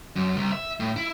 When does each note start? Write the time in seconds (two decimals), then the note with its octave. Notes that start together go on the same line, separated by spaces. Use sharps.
0.16 F#2
0.36 C2
0.52 E5
0.80 A2
0.96 E4